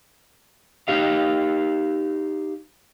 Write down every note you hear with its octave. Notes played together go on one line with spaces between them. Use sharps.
D#4 G4 F5